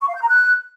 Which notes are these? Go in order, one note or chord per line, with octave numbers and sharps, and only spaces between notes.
C#6
F5
G6
A#5
F#6